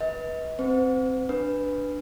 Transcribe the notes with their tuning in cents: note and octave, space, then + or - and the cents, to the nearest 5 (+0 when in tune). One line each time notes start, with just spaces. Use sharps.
B4 -15 D#5 +40
C4 +0 C5 -40
D4 +0 B4 +0